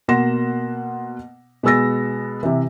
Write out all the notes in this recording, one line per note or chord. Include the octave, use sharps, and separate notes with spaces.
B2 A#3 F#5 C6 A#6 E7
B2 G#3 B3 E6 A6 A#6
C3 E3